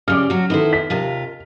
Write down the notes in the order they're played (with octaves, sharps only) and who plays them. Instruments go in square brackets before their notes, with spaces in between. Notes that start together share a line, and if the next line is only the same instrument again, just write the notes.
[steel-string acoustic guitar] C#3 G3 [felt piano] D6 F6
[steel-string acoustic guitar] F#3 F#4
[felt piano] D#3 A4 [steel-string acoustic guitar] B3 E4 C5
[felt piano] B6
[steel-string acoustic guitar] D#2 C3 F4